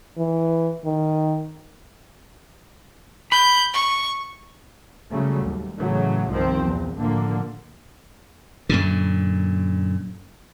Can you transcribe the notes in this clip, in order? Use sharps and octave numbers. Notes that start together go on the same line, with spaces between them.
E3
D#3
B5 G6
C#6
C#3 F#3 G3 A3
D#2
A2 C#3 E3 F#3 A3
C2 G2 D#3 F3 C4
E2 A#2
A2 D3 F3 A#3
F#2 A#2 D3